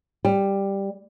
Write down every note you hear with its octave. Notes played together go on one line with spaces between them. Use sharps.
G3